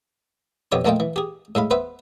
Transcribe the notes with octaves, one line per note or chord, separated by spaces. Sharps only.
F2 B2 G4 C#5 D6
A#1 A3 A#3 F4 D#5 G5
E3
G4 G#4
A2 G#3 F5 B5
B3 B4 C5 E5